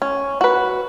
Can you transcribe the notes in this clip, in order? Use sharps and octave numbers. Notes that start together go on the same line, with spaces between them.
C#4
F#4 B4